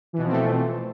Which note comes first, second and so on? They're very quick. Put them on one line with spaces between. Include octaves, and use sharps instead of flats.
E3 B2 F3 C4 A3